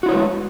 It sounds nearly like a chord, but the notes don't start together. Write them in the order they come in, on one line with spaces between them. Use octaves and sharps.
F#4 E4 C#5 B4 G#3